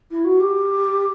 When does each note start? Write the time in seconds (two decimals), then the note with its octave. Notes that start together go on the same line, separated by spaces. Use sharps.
0.10 E4
0.24 F#4
0.40 G4